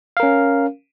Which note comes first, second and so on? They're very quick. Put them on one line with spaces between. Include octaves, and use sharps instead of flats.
F5 A#4 C#4